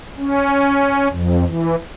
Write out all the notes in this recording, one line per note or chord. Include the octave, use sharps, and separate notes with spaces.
C#4
F2
E3